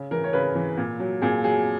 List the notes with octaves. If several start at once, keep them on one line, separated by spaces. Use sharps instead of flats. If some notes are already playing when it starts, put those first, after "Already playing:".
Already playing: C#3
E3 A#4
C#5
C#3 B4
E3
A#2
F#3
A#2 G#4
F#3 G#4